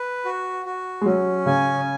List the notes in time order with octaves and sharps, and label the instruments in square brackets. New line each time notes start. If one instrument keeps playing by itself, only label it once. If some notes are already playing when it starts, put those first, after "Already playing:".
Already playing: [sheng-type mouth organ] B4
F#4
F#4
[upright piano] G#3
[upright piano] F#3 [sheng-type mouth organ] C#4
[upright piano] C#3 [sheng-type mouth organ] G#5